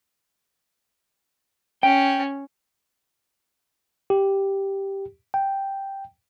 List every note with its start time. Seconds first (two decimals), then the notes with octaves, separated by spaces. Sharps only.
1.83 C#4 G5
4.10 G4
5.34 G5